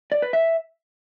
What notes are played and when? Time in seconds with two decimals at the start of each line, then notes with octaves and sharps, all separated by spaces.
0.12 D5
0.22 B4
0.33 E5